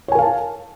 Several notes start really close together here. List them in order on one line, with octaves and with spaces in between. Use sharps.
C#5 G#5 A#4 F5 A5